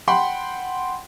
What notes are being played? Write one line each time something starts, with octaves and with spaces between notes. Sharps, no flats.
F#5 G5 B5 C6